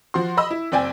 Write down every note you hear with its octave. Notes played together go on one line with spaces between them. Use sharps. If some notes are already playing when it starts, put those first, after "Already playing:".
F3 F#4 C6
D#5 B5 E6
E4
F#1 C4 D5 G5 G#5